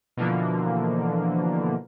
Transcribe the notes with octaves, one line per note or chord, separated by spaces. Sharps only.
B2 D3 E3 F3 A#3